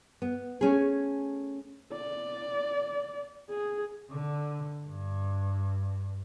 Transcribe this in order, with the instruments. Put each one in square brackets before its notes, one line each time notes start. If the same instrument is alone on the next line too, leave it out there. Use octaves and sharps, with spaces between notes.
[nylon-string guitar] B3
A3 C#4 G#4
[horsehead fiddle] D5
G#4
[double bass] D3
G2